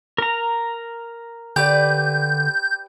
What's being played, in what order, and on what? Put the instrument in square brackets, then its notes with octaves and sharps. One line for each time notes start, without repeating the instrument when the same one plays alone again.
[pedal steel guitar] A#4 A#5
[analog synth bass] D3 [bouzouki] G4 B4 D5 [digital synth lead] G6